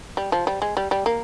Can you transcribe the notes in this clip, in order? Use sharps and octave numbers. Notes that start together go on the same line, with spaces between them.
G3
F3
G3
G#3
G3
G3
A#3